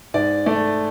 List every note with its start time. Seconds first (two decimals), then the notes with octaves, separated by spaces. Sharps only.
0.14 G#2 D5
0.46 A3 D5